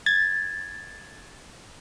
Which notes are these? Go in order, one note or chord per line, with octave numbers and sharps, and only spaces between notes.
G#6 A6